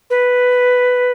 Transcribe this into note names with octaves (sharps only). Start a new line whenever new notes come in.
B4